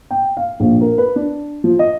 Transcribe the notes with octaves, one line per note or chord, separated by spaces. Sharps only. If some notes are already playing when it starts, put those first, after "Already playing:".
G5
F5
A#1
A#4
B4
D4
F3
D#5